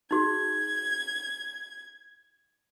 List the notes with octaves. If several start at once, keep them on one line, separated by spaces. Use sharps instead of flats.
D#4 F#4 G#4 G#6